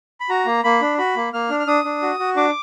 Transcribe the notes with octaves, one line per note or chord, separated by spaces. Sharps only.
B5
F#4 A#5
A#3
A#3 B5
D4
F#4 B5
A#3
A#3 F6
D4
F6
D4 D#6
D4
F#4
F#4
D4 D6